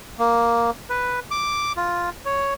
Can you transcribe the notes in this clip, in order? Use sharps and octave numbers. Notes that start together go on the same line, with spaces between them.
A#3
B4
D6
F4
C#5